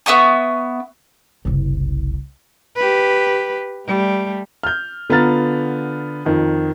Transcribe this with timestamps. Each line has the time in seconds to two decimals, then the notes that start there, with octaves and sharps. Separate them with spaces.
0.06 B3 E5 C#6 D#6
1.45 F#1 C2
2.76 G4 B4
3.87 G3 A3
4.63 F6 G6
5.10 D3 B3 F4 A#5 F6 A6
6.25 F2 D#3